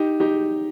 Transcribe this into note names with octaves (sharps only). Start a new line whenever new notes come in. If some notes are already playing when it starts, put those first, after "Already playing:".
Already playing: D#4 G4
D#4 G4